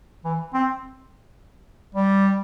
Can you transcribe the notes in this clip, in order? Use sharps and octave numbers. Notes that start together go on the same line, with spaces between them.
E3
C4
G3